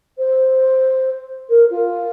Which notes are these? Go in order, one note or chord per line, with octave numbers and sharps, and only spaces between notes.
C5
A#4
F4